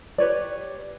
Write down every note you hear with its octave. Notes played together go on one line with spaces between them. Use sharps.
G4 B4 C#5 D5